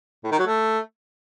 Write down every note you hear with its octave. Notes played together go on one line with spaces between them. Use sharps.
A2
D#3
F#3
A3